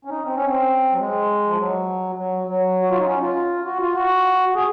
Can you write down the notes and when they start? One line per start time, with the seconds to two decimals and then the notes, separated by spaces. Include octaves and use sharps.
0.05 C#4
0.10 D#4
0.25 C4
0.35 C#4
0.46 C4
0.92 F#3
0.99 G#3
1.46 F3
1.58 F#3
2.17 F#3
2.47 F#3
2.82 F#4
2.90 F4
2.98 D#4
3.06 C#4
3.21 F4
3.65 F#4
3.80 F4
3.95 F#4
4.49 F#4
4.55 G#4